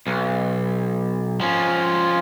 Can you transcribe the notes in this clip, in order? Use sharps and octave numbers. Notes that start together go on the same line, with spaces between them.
B1
F3 C#4